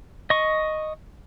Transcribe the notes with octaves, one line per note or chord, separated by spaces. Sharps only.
D#5 C#6